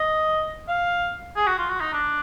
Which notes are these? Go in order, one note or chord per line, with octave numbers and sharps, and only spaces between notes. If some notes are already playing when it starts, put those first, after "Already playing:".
Already playing: D#5
F5
G#4
F#4
F4
F#4
D#4
D4